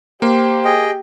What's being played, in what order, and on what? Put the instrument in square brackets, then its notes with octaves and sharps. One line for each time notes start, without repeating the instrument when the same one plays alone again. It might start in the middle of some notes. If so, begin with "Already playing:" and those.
[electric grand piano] A#3 [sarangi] G4 [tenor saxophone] C5
[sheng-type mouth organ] G#4 D#5 G5